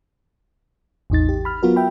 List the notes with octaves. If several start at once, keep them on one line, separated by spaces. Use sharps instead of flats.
A1 E2 D#4 A6
G4
B5 F6
F#3 B3 F4 F#4 A#4
E5 G5 B5